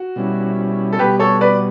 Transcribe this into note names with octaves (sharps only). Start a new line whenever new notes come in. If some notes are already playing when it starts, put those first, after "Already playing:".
Already playing: F#4
B2 G3 C#4 E4
A4
B2 G3 B3 G4 B4
A4 C#5
B4 D5